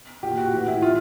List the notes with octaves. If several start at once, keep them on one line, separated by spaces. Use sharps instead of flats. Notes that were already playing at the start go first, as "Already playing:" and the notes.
A#2 G4
F#4
A2 E3
E4
A2 F4